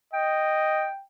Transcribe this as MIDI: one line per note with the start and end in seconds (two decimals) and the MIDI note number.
0.14 0.90 75
0.14 1.01 79